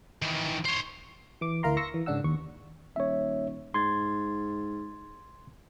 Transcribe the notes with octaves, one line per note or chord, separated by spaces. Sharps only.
D#3 E3
C5 C#5
E3 D6
D2 E4 A#4 F5 A#5 C6
C6 C#6 E6 A#6 C#7
E3
G#2 C#3 D4 F#5 E6
D#2 C#6
D#1 C#5 E5
G#2 C6 G#6 A6